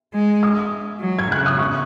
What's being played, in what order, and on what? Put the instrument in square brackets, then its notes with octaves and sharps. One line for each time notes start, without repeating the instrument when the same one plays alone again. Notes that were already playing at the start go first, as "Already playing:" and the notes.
[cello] G#3
[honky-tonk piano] D#6
[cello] F#3
[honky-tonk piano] G#6
[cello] C#3 [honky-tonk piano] F#6
[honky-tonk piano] D#6
C#6